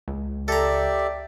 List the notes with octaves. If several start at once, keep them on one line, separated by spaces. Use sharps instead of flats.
C#2
G4 A4 D5 E5 A#5